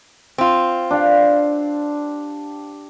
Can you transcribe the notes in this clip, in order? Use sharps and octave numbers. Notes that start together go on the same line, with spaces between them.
C4 F4
D4 G4 F5